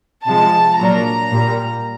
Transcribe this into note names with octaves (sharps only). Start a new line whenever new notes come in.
C3 F3 G#3 A5
A#2 F#3 A#3 D4 A#5
A#2 G3 A#3